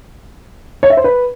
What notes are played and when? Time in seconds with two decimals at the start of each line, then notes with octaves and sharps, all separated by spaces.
0.83 C#5
0.90 E5
0.97 C5
1.04 B4